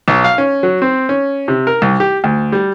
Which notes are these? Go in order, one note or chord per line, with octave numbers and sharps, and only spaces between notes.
B1
F5
C#4
F#3
C4
C#4
C3
A#4
C2
G4
D2
G3